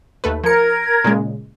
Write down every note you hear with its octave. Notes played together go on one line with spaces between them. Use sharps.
D#2 A3 B4
F3 A#4 G#6 C#7
A#2 C#3 G#3